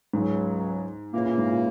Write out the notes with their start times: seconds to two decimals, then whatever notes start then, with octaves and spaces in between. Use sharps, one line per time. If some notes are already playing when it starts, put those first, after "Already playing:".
0.13 C#2 G#2 C#3 F#3
1.13 A#2 C#3 E3 A#3
1.26 A#2
1.38 G#2
1.51 A#2